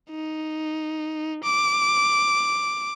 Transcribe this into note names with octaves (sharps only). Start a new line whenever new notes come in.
D#4
D6